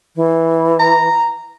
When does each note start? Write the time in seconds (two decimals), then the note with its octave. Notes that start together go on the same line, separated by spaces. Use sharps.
0.16 E3
0.80 A#5